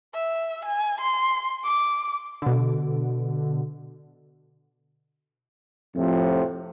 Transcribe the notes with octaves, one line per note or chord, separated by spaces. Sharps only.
E5
G#5
C6
D6
B2 D3
F2 A2 C3 F3